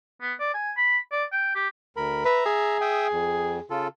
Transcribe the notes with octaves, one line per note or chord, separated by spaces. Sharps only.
B3
D5
G#5
B5
D5
G5
G4
D2 A#4 B5
B4 E5 A#5
G#4
E5 G5 D#6
F2
C#3 F4 A4